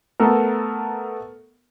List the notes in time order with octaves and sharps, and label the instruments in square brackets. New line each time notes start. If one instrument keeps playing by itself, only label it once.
[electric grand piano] A3 B3 A4 A#4